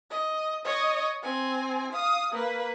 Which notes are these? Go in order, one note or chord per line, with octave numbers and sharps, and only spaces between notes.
D#5
C#5 D#5
C4 G#5
F5 D#6
A#3 B4